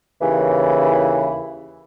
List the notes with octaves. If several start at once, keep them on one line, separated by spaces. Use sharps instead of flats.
D#2 C#3 E3